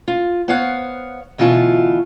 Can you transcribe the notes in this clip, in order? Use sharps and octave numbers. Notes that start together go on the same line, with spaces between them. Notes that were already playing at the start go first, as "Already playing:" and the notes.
F4
B3 C5 C#5 F5 F#5
D2 B2 E3 F4 A4 C#5